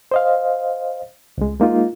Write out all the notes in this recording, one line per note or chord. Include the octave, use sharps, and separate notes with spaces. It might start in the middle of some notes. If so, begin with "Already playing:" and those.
C5 D#5 F5
C#2 G#3
G#3 A#3 D#4 F4